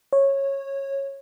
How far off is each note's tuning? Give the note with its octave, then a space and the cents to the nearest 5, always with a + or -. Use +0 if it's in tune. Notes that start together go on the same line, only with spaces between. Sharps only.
C#5 -15